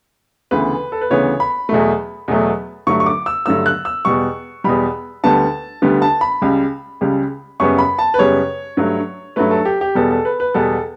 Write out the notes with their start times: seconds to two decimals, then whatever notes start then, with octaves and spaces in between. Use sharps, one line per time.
0.51 D2 C#3 E3 B3 B4
0.92 A4
1.01 B4
1.10 D2 C#3 E3 B3 C#5
1.40 B5
1.69 E2 B2 F#3 A3
2.28 E2 B2 F#3 A3
2.87 G2 D3 F#3 A3 C#6
3.00 C#6
3.06 D6
3.26 E6
3.46 G2 D3 F#3 A3 E6
3.66 F#6
3.85 E6
4.05 E2 B2 G3 C#6
4.64 E2 B2 G3 B5
5.24 D2 D3 G3 B3 A5
5.82 D2 D3 G3 B3
6.02 A5
6.21 B5
6.42 C#2 C#3 G3
7.01 C#2 C#3 G3
7.60 F#2 C#3 G3 B3 C#6
7.78 B5
7.99 A5
8.14 B4
8.18 F#2 C#3 G3 B3 C#5
8.77 G2 F#3 A3
9.36 G2 F#3 A3 B4
9.51 A4
9.65 G4
9.81 G4
9.95 E2 B2 G3 B3 A4
10.11 A4
10.25 B4
10.40 B4
10.54 E2 B2 G3 B3 A4